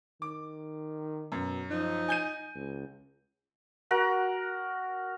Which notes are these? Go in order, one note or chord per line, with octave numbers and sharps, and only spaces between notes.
D#3 D6
F#2 B2
F3 D#4
G#5 G6 D#7
C#2
F#4 A#4 F#5